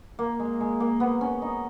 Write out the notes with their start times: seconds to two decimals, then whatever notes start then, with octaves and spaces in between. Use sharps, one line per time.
0.19 A#3
0.39 G#3
0.60 G#3
0.80 A#3
1.00 B3
1.21 C#4
1.42 D#4